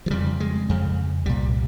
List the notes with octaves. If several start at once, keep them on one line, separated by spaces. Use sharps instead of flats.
F3
F2 C#3 G3
G#3
F2 C#3
C2 A#2 G3